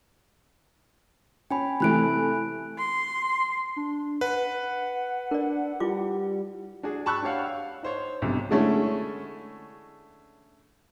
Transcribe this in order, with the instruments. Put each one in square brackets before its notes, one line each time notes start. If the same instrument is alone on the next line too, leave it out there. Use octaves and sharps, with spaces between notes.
[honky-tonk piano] C#4 [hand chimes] G5 G#5 B5
[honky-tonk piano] C3 E3 A3 [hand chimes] B5 F#6 D7
[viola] C6
[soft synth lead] D4
[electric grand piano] B4 [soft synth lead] F#5
[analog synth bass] D4 [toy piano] A#4 D5
[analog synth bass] G3 [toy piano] E4 F4 D6
[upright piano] D4 F#4 G#4
A5 B5 C#6 E6 F#6
D4 G4 C#5 F5 F#5
F5
D#4 C5 C#5
B1 G2 C3
[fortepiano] D3 G#3 A3 C#4 E4